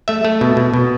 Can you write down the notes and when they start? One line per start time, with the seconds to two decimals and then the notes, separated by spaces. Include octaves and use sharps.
0.08 A3 E5
0.25 A3
0.41 B2
0.57 B2
0.74 B2